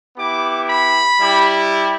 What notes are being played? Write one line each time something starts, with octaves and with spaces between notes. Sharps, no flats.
B3 E4 G4 D6
B5
G3 E4 G4